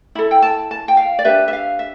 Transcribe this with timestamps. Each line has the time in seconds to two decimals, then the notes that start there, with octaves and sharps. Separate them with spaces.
0.15 E4 A4 B5
0.31 G5
0.42 A5
0.71 A5
0.88 G5
0.97 F5
1.19 D5
1.25 D4 G4 B4 E5
1.48 E5
1.53 F5
1.79 E5